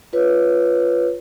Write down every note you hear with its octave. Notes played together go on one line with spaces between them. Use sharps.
F4 B4 C#5